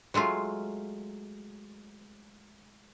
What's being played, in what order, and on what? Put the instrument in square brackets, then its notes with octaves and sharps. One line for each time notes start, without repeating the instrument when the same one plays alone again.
[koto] F#3 G#3 A3 F4